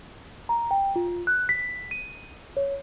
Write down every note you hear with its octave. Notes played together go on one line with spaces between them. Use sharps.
A#5
G5
F4
F#6
B6
D#7
C#5